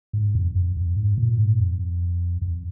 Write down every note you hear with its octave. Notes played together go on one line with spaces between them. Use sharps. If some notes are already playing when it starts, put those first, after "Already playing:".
G#2
F2
F2
F2
G#2
A#2
G#2
F2
F2